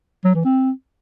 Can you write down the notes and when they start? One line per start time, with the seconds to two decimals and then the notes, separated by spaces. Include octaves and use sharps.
0.25 F#3
0.35 E3
0.45 C4